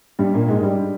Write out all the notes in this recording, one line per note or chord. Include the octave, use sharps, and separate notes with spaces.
G2 G3
A#2 A#3
G#2 G#3
G2 G3